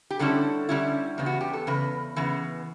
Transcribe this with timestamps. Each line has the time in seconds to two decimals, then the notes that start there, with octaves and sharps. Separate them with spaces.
0.11 G4
0.19 D3 G3 C#4 E4 A4
0.69 D3 G3 C#4 E4
1.18 E2 C#3 B3
1.26 F#4
1.41 G4
1.53 A4
1.67 E2 C#3 B4
2.16 C#3 E3 B3